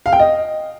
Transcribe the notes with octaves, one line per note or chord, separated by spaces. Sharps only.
F5
G5
D#5